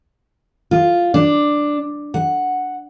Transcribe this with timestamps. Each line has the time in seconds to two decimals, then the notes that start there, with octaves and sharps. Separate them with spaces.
0.71 F4
1.14 D4
2.14 F#5